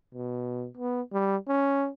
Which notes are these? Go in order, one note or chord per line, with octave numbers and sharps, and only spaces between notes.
B2
B3
G3
C#4